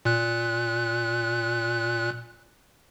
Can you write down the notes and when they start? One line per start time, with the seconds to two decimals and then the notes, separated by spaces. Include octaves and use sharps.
0.05 A#2 F#6